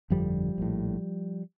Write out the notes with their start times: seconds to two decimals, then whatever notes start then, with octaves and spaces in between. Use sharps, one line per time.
0.10 G1 F2 D3 F3 G3
0.58 A#1 A2